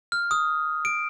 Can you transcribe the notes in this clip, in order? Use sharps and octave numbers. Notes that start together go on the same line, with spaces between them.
F6
D#6
D7